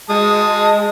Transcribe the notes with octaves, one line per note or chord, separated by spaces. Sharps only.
G#3 A5 D#6